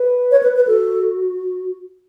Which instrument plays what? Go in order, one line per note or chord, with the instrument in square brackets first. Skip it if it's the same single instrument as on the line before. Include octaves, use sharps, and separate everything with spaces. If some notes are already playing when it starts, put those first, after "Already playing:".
Already playing: [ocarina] B4
[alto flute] C#5
B4
B4
[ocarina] F#4 [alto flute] A4